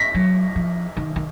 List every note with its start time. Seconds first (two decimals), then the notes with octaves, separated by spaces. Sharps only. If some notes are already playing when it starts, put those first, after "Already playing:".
Already playing: A#6 B6
0.14 F#3
0.56 F3
0.97 D#3
1.16 D#3